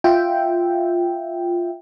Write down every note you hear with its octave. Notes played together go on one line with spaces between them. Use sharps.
F4 E5 G5